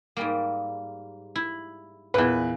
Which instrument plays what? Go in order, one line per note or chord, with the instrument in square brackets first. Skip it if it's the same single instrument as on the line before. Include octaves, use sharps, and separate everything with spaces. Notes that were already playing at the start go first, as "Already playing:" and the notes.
[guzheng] G#2 G3 A#3
E4
[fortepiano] E2 B4 [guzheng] A#2 E3